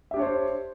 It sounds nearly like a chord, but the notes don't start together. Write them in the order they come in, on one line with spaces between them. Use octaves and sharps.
E5 G4 D4 C#5 C5